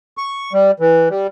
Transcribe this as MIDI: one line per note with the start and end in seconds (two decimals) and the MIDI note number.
0.18 0.53 85
0.53 0.71 55
0.80 1.09 52
1.10 1.27 55